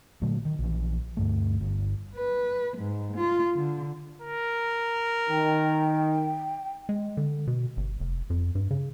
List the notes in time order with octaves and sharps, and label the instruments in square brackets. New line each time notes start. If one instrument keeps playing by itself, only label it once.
[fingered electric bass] A#2 D3 F#3 A3
D#3
A#1 E3
D2 G2 A3
G1
[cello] B4
G#2
F4
D3
[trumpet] A#4
[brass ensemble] D#3 [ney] G5
[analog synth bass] G#3
D3
B2
G1
F1
F2
G2
C#3